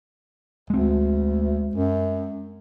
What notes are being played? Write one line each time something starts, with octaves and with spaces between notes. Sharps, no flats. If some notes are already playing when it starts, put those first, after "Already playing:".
D2 G#3 C4
F#2